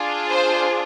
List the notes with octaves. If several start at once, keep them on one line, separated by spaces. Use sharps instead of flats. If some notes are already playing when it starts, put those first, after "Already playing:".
Already playing: D4 F4 G#4
C5